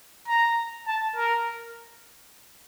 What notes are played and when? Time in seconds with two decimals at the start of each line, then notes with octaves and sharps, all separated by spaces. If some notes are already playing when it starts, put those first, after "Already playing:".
0.28 A#5
0.87 A5
1.16 A#4